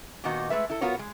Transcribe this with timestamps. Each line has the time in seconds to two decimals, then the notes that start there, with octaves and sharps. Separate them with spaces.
0.24 A#2 D#3 B3 D#4 F#4
0.50 G#3 A3 B4 E5
0.70 E4 A4
0.81 B3 F4 F#4 A#4 C#5
0.99 G#3